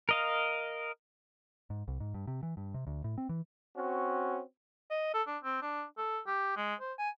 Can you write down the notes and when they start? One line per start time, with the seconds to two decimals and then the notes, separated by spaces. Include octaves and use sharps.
0.09 A#4 D#5 F5
1.70 G#2
1.88 C2
2.00 G#2
2.14 G2
2.27 C3
2.43 E3
2.57 G2
2.74 C3
2.87 D2
3.04 A2
3.18 C4
3.29 E3
3.76 C4 C#4 F#4
4.90 D#5
5.14 A4
5.27 D4
5.43 C4
5.62 D4
5.98 A4
6.27 G4
6.57 G#3
6.80 C5
6.98 G#5